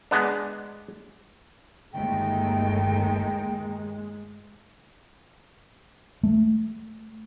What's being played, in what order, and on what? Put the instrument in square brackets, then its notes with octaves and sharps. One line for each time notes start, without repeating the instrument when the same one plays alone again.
[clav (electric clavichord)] G#3 B3 D4
[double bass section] G1 A3 [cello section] D#2 D#3 D#4 [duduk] G#3 [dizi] G5
[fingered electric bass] A3